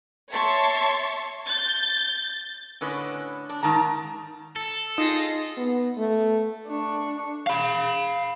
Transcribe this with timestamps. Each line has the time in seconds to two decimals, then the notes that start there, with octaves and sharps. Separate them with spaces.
0.29 C#5 E5 A5 C6 C#6
1.46 G6 A6
2.81 A2 D3 C#4 B4 D#5
3.49 D4
3.63 G#2 D#3 A5 A#5
4.56 A4
4.98 D#4 F4 G#4 A#6
5.57 B3
5.98 A3
6.67 D4 C#6
7.47 F5 B5